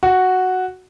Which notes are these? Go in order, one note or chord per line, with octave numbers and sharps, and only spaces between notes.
F#4